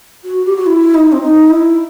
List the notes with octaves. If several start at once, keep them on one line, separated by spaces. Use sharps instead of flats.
F#4
G4
F#4
E4
D#4
C4
D#4
E4